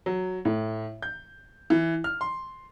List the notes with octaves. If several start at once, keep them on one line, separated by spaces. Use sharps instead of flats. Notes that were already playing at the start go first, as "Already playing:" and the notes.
F#3
A2
G6
E3
F6
C6